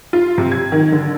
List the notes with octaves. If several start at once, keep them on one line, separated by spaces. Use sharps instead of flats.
F4
C3
G#6
D#3
D3